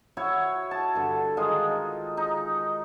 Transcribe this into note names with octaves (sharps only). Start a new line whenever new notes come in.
E4 F#4 C#5
A5
G2 D3
D#3 G#3 D#4 F4
D#4